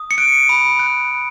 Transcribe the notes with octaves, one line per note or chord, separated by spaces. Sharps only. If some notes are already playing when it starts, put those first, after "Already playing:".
Already playing: D#6
C#7
F#6 D7
B5
F#6
B5